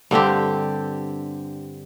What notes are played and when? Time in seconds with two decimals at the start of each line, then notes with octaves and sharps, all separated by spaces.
0.11 G2 D3 C4 G4